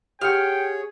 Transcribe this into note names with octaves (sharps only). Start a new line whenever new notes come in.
G4 G#4 C#5 F#5 G5 F6 C#7